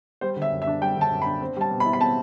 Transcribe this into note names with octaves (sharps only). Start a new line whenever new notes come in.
G3 C5
D3
E5
F#2
E5
D4
G3 G5
D3
A5
F#2
B5
D4
C4
G3 A5
B2
B5
E4
B5
C4 A5